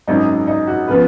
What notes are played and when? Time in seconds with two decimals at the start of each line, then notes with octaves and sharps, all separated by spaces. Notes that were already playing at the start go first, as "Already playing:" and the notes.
0.07 G#1 F#2 C#3 F#3 D#4
0.47 D#4
0.68 F#4
0.88 C#3 F3 B3 B4